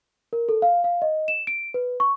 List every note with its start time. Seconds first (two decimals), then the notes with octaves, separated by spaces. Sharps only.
0.33 A#4
0.49 A4
0.62 F5
0.84 F5
1.02 D#5
1.28 E7
1.47 D7
1.74 B4
2.00 C#6